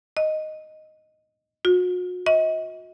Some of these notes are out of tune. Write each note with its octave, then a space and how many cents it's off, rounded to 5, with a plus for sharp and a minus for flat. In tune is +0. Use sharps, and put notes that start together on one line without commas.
D#5 -5
F#4 -40
D#5 +35